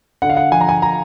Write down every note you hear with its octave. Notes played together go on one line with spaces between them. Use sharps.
D3 F#5
F5
F#5
F3 G#5
A#5
G#5
A#5